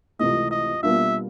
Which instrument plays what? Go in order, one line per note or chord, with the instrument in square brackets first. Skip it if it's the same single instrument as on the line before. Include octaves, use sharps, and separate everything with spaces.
[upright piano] C#2 C3 E3 A3 [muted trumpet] D#5
[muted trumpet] D#5
[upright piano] B2 G3 A#3 D4 F4 [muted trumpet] E5